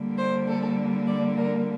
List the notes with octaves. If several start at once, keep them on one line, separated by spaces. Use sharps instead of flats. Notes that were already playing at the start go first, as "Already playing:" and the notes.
Already playing: D3 G3 A#3
C5
A4
D5
A#4